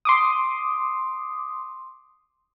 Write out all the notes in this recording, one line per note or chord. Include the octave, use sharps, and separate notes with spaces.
C6 D6 D#6